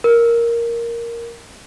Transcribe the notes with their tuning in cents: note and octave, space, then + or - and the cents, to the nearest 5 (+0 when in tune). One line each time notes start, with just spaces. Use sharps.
A#4 +0